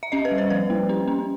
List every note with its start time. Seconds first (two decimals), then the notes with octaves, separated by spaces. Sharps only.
0.03 E5
0.12 C#4 D#5
0.25 B4
0.32 G3
0.38 C5
0.50 F3 B4
0.70 A#3
0.89 C#4
1.08 C#4